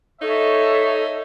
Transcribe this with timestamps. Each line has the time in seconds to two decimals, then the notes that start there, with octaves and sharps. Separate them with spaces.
0.22 D#4 A4 C#5 E5